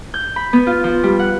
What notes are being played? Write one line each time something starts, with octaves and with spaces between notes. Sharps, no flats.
G6
B5
B3
F4
F3
G3
F#5